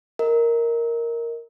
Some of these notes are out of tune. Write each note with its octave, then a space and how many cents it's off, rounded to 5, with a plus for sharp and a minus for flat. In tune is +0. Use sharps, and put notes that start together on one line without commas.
A#4 +0 D#5 +30